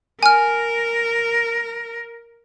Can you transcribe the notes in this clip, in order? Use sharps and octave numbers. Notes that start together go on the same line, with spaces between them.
A#4 G#5 F6